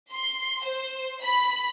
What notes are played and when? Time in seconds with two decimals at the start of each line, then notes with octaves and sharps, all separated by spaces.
0.11 C6
0.64 C5
1.21 B5